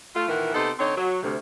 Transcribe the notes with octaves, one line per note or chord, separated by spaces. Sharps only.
A3 F4
A#2 D#3 E3 A#4 F#5
C3 B3 D#4 A4 C5
D3 C4 D#4 C#5
F#3
D2 C3